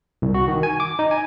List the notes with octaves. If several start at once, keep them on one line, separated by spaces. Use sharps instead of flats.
C2
F#4
D#3
G#5
D6
D#4
G#5